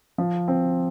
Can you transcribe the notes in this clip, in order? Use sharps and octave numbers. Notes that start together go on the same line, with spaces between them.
F3
C4